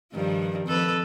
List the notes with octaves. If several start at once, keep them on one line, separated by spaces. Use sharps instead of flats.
G2 D#3 F3
F2 A4 B4